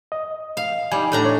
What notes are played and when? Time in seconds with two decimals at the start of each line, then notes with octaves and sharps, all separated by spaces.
0.12 D#5
0.57 F5
0.92 G3 D#4 D5 G#5
1.12 A2 D4 A#5
1.25 C#5